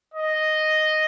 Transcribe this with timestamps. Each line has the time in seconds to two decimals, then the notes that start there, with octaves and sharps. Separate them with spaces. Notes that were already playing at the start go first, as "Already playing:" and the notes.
0.14 D#5